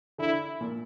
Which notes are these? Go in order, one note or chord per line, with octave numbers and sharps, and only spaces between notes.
D3 E4
A#2